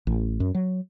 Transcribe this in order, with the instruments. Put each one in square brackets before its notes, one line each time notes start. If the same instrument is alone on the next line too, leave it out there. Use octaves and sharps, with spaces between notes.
[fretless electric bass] A1
F#2
F#3